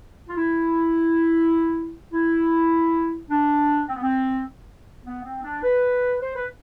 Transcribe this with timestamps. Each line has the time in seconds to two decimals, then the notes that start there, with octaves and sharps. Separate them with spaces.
0.28 F4
0.36 E4
2.12 E4
3.30 D4
3.88 C4
3.95 B3
4.03 C4
5.04 B3
5.24 C4
5.44 D4
5.63 B4
6.21 C5
6.36 B4